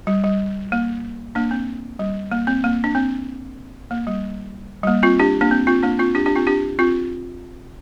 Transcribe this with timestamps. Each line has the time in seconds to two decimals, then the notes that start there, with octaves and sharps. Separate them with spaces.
0.07 G3
0.24 G3
0.72 A#3
1.35 A#3 D4
1.51 C4
1.99 G3
2.32 A#3
2.47 C4
2.64 A#3
2.84 D4
2.95 C4
3.91 A#3
4.07 G3
4.83 G3
4.87 A#3
5.03 C4 F4
5.19 D4 G4
5.41 A#3 D4
5.51 C4
5.67 C4 F4
5.83 A#3 D4
5.99 C4 F4
6.15 D4 G4
6.26 D4 G4
6.36 C4 F4
6.47 D4 G4
6.79 C4 F4